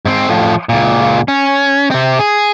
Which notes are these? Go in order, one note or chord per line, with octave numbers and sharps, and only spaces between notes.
G#2 C4
A2 F3
C#2 A#2
C#4
C3 C4
G#4